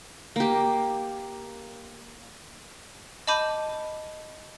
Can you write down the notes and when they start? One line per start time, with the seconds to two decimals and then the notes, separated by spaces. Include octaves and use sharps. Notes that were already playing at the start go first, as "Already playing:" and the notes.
0.36 A#3 G4
3.27 D#5 A5 B5 D6 G6 D#7